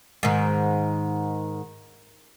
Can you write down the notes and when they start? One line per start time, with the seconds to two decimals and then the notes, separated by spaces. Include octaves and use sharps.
0.23 G#2 D#3